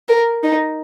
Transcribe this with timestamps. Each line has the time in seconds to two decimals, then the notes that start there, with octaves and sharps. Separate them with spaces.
0.08 A#4
0.43 D#4